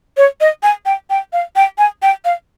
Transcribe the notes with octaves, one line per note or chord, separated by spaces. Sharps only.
C#5
D#5
G#5
G5
G5
F5
G5
G#5
G5
F5